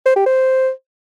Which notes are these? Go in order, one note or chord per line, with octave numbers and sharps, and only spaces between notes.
C5
G4
C5